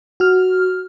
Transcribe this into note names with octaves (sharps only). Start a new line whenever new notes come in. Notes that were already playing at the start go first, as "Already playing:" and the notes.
F#4 F6